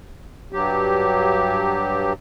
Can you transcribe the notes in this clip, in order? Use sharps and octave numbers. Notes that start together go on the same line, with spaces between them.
G2 F#3 G4